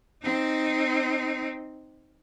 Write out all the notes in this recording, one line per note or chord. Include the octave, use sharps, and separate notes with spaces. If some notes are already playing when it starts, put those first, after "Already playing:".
C4 D#4